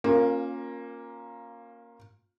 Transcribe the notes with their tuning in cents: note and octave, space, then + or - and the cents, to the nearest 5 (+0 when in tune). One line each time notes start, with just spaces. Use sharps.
A#3 +0 C#4 -20 F4 +30